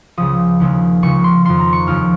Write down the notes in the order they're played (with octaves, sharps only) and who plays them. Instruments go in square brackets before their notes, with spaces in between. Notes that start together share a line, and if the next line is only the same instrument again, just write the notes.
[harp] C#2 C#3 F3 D#6
D#2 C#3 F3
C#2 C#3 F3 C#6
C6
F2 D#3 C6
A#5
C#6
D#2 C#3 F3 F6